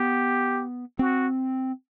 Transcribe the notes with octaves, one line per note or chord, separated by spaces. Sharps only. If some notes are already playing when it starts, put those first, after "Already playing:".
Already playing: B3 G4
C4 F#4